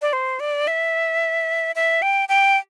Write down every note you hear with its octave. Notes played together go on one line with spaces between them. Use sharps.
D5
C5
D5
E5
E5
G5
G5